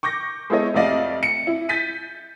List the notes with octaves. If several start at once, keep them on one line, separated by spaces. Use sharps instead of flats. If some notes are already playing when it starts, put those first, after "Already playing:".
C#6 D6 G6 A#6
G#3 B3 E4 A4 C#5 D#5
F2 C3 A3 D5 D#5 F5
C#7
E4
G6 A6 B6 D#7